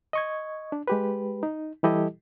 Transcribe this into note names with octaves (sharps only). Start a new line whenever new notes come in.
D#5 C#6 G#6
D4
G#3 G4 B4
D#4
E3 G3 E4 G4 A4 D#5